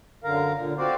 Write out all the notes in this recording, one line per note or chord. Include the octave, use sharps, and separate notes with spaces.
F#2 D3 A#4 F5 A#5
A#2 D3
C4 F#4 G4 C5 D5 F5